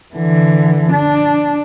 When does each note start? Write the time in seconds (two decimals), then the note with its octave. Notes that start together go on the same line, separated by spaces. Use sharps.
0.15 D3 E3
0.93 D4